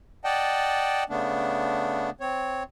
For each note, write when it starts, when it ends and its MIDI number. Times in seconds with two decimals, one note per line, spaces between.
0.24 1.04 74
0.24 1.04 75
0.24 1.04 78
0.24 1.04 79
0.24 1.04 81
1.10 2.10 49
1.10 2.10 57
1.10 2.10 59
1.10 2.10 62
2.20 2.63 60
2.20 2.63 73